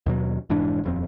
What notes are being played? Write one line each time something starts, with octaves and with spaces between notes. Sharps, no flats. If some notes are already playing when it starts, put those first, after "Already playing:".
D#2 B2 F#3
F1 G#2 E3 D4
D#1 F2 C4